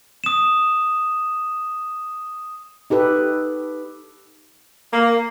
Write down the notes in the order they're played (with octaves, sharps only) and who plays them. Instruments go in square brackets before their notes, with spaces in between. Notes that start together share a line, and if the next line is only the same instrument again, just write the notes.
[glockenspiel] D#6 E7
[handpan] D#4 G4 A4 B4
[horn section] A#3